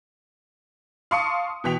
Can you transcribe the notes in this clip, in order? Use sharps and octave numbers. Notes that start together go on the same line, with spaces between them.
F5 A5 C6 C#6 D#6 C#7
B2 E3 G5 B6 F7